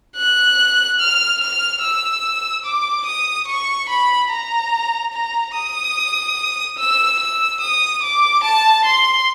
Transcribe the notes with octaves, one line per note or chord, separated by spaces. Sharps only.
F#6
F6
F6
E6
D6
D#6
C#6
B5
A#5
A#5
D#6
E6
E6
D#6
D6
A5
C6